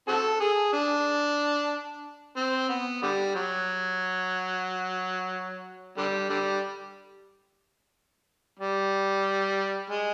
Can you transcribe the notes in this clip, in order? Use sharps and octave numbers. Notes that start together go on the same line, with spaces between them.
C4 F#4 A4
G#4
D4
C4
B3
D3 G3
F#3
D3 G3
D3 G3
G3
G#3